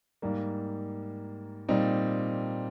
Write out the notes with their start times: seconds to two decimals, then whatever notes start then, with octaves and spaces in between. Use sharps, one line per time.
0.22 G#2 G3 A#3
1.69 A#2 G3 C4 D#4